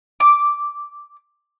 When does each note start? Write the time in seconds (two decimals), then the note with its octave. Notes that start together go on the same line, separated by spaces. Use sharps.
0.20 D6